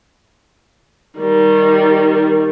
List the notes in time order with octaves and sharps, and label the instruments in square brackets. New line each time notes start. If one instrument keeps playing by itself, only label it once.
[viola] D#3 G3